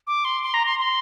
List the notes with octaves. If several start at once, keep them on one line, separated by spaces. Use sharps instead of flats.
D6
C6
C6
A#5
C6
C6